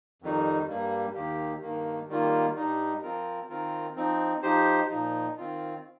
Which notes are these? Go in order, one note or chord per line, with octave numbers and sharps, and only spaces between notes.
F2 D#3 G3 D#4
G2 G3 A#3
D#2 D#3 A#3 G4
G2 D#3 A#3
D#3 G3 A#3 F4
G2 G3 D#4
F3 C4 F4 A#4
D#3 C4 F4 A#4
F3 C4 D#4
F3 D#4 G4 C5
A#2 F3 D#4
D#3 C4 F4